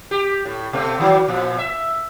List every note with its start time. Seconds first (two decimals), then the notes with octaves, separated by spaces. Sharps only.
0.11 G4
0.45 A2
0.73 B2 A3 C4
1.00 D#3 F#3
1.28 A#2 F3
1.59 E5